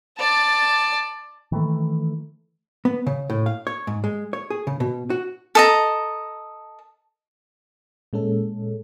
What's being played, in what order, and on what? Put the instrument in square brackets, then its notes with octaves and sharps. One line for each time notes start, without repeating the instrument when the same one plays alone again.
[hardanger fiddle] D5 A5
[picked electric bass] D#3 E3 A3
[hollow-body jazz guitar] B3
C#3
A2
F5
C#5
G#2
G#3
C#5
G#4
C#3
B2
F#4
[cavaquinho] A4 D#5 A#5
[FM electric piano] A#2 G#3 C#4 A4